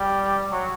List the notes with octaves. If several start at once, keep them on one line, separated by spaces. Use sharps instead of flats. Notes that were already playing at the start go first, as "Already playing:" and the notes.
Already playing: G3
F#3